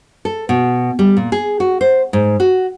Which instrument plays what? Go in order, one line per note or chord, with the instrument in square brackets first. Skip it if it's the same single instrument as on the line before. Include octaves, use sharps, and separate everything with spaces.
[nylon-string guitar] A4
B2
G3
A#2
G#4
F#4
C5
G#2
F#4